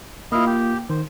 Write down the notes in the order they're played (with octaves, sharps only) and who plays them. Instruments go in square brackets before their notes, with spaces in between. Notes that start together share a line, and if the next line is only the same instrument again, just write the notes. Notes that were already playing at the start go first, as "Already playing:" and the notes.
[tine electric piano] A#3 F4 [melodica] E4 D#5 F5
[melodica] G4
[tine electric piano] D#3 [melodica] C5